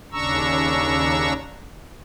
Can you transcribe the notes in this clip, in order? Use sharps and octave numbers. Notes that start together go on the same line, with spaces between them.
D#2 C#3 D4 A#5 C#6 E6